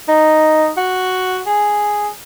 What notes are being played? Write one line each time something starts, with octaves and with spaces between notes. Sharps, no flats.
D#4
F#4
G#4